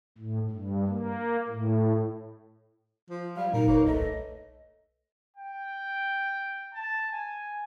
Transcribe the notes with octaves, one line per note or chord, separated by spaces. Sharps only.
A2
G2
A#3
A2
F3
F#3 G3 F5
A#2 F#3 D#4 A#4
F1 A#3 B4 C#5
B1 A3 D#5
G5
A5
G#5